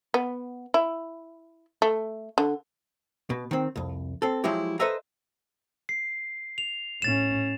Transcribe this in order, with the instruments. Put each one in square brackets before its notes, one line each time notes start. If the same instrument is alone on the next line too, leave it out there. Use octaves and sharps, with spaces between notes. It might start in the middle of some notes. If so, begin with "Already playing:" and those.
[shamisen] B3
E4
A3
D3
[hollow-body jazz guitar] B2
D#3 C4
C2 F2
C4 A4
F3 F#3 G#3 E4 G4
A4 B4 C5 D#5 E5 A#5
[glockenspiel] C7
F7
[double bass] A2 C#4 [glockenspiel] A6 E7